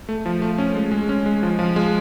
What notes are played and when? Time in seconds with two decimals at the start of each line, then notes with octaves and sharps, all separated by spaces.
0.09 A3
0.26 F3
0.42 A3
0.58 C#4
0.75 G#3
0.92 G#3
1.09 C#4
1.26 G#3
1.43 F3
1.59 F3
1.76 G#3